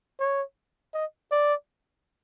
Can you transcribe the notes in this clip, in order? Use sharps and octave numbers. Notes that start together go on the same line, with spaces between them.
C#5
D#5
D5